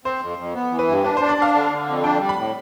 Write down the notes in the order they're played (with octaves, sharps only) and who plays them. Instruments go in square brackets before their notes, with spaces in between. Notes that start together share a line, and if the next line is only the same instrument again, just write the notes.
[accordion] C4 [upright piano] C5
[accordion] F2
F2
B3
E3
[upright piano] B4
[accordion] G2
[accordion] D4 [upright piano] B4
[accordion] D4 [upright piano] C5
[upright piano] D5
[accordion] D4 [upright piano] F5
[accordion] D3
D3
F2
[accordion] D4 [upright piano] G5
[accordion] G3
[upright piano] B5
[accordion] A2